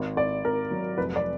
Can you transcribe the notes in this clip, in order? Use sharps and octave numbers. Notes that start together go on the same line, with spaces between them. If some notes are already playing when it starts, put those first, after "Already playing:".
Already playing: G#1
G#1 D5
G#1 A#4
F#3
F1 B4
D5